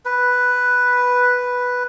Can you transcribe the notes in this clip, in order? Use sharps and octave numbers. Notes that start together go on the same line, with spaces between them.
B4